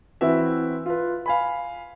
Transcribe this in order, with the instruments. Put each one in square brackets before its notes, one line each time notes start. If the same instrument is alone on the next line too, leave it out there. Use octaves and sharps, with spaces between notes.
[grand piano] E3 C4 E4 F#4 B4 E5
F4 B4
F5 G#5 B5